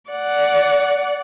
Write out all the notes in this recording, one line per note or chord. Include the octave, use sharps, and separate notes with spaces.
D5 F#5